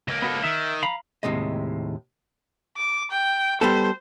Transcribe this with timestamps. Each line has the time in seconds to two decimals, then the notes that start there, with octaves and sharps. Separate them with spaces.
0.08 C#2 A#3
0.22 B3 F#4 A4
0.44 D#3 E5
0.83 F5 A#5 B5
1.23 D#2 A2 C3 G#3 D#5
2.77 D6
3.11 G5
3.61 G3 B3 A4 C5